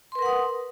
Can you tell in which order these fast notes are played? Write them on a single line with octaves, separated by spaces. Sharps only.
C6 B4 A#4 F#5 D#6